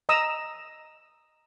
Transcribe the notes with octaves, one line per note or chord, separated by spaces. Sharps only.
D#5 A#5 D#6 E6